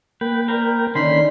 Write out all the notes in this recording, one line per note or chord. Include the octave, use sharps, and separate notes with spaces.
A#3 B4 G5
A#4 C5 A#5 B5
D3 D#3 A#3 C#4 D#4 B5 C6 B6